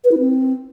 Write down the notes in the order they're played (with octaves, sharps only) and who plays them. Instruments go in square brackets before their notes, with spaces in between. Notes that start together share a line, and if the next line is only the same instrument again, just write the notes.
[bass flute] B4
E4
C4